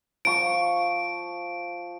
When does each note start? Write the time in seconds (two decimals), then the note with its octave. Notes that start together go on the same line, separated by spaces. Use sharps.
0.25 F3 C#6 D7